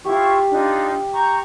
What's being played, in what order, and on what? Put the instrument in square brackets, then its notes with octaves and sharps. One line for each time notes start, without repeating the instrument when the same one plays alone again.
[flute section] E4 F4 C#6 [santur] G4 F5
[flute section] D4 D#4 F4
A#5 C#6 G6